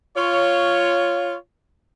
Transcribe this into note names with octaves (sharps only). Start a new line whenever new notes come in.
F4 C#5